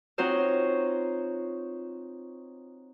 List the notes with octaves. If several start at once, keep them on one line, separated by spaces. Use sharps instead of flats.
C4 D#4 F4 F#4 C5 C#5